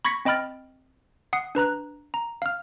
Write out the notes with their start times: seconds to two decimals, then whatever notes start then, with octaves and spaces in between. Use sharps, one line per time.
0.05 B5 C#6 G#6 A#6 B6 C#7
0.25 C4 D#5 G5 B5 F6 A6
1.33 F#5 D#6 C7
1.55 D4 B4 A#5 F#6
2.14 A#5
2.42 F5 F6